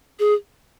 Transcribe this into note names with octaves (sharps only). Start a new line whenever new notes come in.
G#4